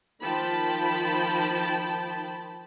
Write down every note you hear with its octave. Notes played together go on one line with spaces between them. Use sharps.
D#3 F3 G5 A5 B5